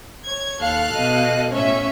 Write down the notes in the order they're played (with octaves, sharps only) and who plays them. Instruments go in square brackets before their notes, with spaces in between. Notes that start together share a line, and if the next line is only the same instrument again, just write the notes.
[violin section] C#5 G#6
[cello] D#2 [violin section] A4 F5 F#6
[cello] B2 D#5
[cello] A2 C#4 [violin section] C#5 E5